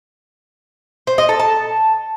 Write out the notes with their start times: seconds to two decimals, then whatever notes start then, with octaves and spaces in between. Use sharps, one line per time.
1.07 C5
1.18 D#5
1.29 A4
1.40 A5